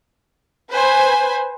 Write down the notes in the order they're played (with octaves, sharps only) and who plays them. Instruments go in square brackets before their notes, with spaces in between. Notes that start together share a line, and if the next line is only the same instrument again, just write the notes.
[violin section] B4 C5 G#5